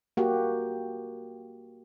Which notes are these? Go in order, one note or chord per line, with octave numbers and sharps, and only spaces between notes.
A#3 F#4 G4